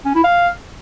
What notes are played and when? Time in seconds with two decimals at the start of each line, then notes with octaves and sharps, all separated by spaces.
0.05 C#4
0.14 E4
0.24 F5